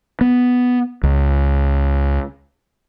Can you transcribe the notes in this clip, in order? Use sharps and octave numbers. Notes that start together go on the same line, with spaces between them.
B3
C#2